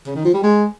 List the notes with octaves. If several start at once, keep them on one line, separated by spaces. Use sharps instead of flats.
C#3
D#3
F3
G3
G#3